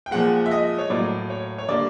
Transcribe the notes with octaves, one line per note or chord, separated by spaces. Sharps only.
G5
A#2 F3 G#3 F#5
E5
D#5
C#5
A2 F#3 A#3 D5
C#5
C#5
D3 G3 A#3 D5